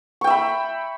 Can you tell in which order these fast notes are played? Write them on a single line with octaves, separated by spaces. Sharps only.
C#6 G5 E5 B5